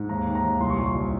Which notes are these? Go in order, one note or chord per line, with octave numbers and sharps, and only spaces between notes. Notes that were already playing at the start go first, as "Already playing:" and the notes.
Already playing: G#2
D#2 A#5
D#3
A#5
D#2
C2 C6
C#6
A#2 C6
C2